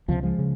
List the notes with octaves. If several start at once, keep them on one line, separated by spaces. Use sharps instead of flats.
C#2 C3 F3
F3 G#3
C#3